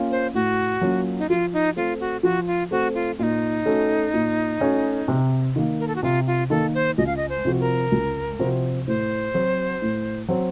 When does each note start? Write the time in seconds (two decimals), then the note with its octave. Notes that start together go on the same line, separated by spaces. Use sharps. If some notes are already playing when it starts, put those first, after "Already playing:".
Already playing: A#3 C#4 F4
0.11 C5
0.34 A2 F#4
0.81 F#3 A#3 C#4 F4
1.19 D#4
1.29 F3 F4
1.53 D#4
1.76 A3 C4 F4
2.00 F#4
2.23 F3 F#4
2.47 F4
2.71 A3 C4 F#4
2.95 F4
3.18 A#2 D#4 F4
3.66 A3 C#4 F#4
4.14 A#2
4.60 A3 C#4 F#4
5.08 C3
5.56 D#3 A#3
5.80 A#4
5.88 A4
5.96 F#4
6.03 C3 F4
6.27 F4
6.50 D#3 A#3 A4
6.74 C5
6.98 C#2 D#5
7.06 F5
7.17 D#5
7.29 C5
7.45 C3 F3 C4 F#4
7.60 A#4
7.92 C#2
8.39 C3 F3 C4 F#4
8.87 A2 C5
9.34 F#3 C4 F#4
9.82 A2
10.28 F#3 C4 F#4